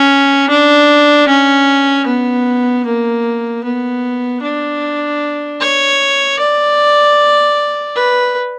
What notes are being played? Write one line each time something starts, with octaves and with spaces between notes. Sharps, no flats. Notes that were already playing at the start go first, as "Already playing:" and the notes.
Already playing: C#4
D4
C#4
B3
A#3
B3
D4
C#5
D5
B4